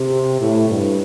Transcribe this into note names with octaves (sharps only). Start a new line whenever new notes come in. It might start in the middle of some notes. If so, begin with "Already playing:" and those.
Already playing: C3
A2
G2